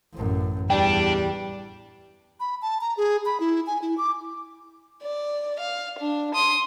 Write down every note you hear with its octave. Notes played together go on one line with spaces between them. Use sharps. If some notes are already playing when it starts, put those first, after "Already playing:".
A1 F#2
E2 G3 D4 G5
B5
A5
A#5
G#4
B5
E4
G#5
E4
D6
D5
F5
D4
C6 D#6